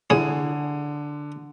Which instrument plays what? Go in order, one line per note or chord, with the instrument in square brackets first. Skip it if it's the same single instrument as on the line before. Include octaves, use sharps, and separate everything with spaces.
[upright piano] D3 D#7 [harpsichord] E4 G#4 C#5